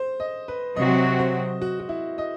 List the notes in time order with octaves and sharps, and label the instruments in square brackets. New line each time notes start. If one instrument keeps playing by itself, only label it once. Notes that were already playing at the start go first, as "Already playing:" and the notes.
Already playing: [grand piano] C5
D#5
B4
[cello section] C3 F#3 C4 F#4 [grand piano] D#5
[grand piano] C5
F#4
F#4
E4
D#5